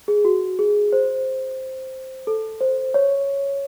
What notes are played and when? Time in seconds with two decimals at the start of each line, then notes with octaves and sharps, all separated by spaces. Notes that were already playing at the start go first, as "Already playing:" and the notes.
0.08 G#4
0.25 F#4
0.59 G#4
0.93 C5
2.27 A4
2.61 C5
2.94 C#5